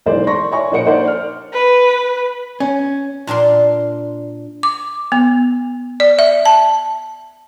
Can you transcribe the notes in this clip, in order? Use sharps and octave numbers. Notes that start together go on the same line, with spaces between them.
B1 G#2 E3 G#4 C5 D5
C6 C#6 A#6
C#5 D5 E5 G#5 C#6
A#1 A#3 C5 F#5 C#7 D7
D#4 C5 D5
F6
B4
C#4
A#2 D4 A#4 C6
D6
B3
D5
E5
A5